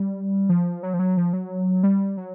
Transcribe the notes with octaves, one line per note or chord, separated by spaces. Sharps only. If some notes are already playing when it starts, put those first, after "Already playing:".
Already playing: G3
F3
F#3
F3
F#3
F3
F#3
G3
F#3